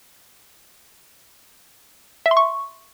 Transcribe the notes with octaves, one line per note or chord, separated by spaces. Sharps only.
E5
C6
C#6